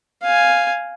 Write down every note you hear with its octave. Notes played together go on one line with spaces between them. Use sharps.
F5 G#5